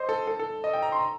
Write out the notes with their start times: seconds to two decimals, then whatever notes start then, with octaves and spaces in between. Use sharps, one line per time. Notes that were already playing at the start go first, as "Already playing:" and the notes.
Already playing: C5 D#5
0.09 A4
0.27 A4
0.39 A4
0.64 D#5
0.73 G5
0.82 A#5
0.92 C6
0.99 A#5